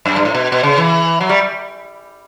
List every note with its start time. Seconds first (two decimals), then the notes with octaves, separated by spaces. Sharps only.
0.06 F#2
0.16 G2
0.25 A2
0.35 B2
0.52 B2
0.63 C#3
0.78 E3
1.21 F#3
1.29 G3